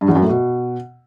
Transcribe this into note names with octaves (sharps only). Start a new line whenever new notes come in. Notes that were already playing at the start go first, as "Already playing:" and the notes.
G2
E2
F#2
A2
B2